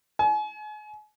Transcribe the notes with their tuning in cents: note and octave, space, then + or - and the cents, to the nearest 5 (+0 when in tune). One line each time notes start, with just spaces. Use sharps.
G#5 +35